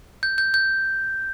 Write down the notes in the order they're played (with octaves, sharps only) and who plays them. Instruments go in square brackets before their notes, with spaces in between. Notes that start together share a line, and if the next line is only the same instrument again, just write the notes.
[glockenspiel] G6
G6
G6